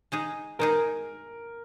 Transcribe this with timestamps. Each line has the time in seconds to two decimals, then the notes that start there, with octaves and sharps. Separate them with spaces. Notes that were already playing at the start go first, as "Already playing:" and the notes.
0.12 G#3 D#4 G#4
0.59 G#3 D#4 G#4 A#4